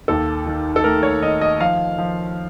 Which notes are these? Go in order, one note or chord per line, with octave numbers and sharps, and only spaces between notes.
D#2 A4
D#3
A4
A3 A#4
C#5
D#3 D#5
D#5
F3 F5
F3